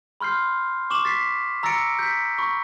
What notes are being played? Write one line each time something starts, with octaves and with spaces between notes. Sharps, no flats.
B5 C6 F6 G6 C7
C#6 D6 E7 F#7
A6 B6 C7
A#5 E6 A6 A#6 C#7 D7
G6 B6
B5 C#6